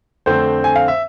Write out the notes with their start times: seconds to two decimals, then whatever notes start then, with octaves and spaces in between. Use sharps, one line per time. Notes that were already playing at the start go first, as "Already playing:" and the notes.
0.26 F2 D3 A3 C4 C5
0.64 G#5
0.76 F5
0.88 E5